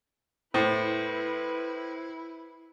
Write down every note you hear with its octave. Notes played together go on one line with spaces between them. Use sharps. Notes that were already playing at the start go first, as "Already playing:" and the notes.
A2 E4 B4 C5